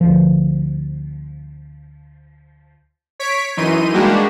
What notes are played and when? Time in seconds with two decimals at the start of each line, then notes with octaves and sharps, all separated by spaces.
0.01 D2 F3
3.20 C#5 B6 D7
3.57 F#2 E3 D#4 C6 D#7
3.94 G3 G#3 A#3 D4 F#4 G4